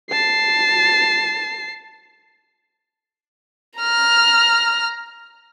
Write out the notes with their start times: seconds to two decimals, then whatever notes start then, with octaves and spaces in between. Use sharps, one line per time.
0.11 A5 C7
3.79 A#5 F6